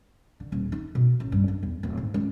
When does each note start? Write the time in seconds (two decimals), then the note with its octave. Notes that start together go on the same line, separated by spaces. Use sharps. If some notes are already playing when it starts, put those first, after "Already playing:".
0.40 D3
0.52 D#1
0.72 D#4
0.95 B2
1.20 A1
1.32 G2
1.48 D4
1.63 E2
1.83 D1
1.97 G#2
2.14 C#2